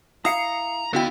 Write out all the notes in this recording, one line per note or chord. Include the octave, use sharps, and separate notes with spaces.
E4 F5 A#5 D#6 C7 C#7
D3 B3 D#4 E4 F#4 F5 G5